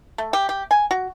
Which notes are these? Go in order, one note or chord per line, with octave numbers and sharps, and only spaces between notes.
A3
G4
G4
G#5
F#4